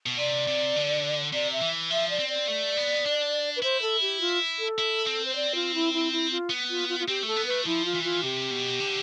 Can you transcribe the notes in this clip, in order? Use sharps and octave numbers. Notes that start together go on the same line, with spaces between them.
B2
C3 D5
C3
D3
C3 D5
E5
E3
F3 E5
D5
C4
D5
A3
B3
D4
B4
E4 C5
A4
G4
F4
A4
E4
C4
C5
D5
F4
E4
E4
E4
F4
B3
F4
F4
F4
C4 G4
A3 A4
B3
A3 B4
F3 E4
F4
E3
F4
C3 G4
B2
D3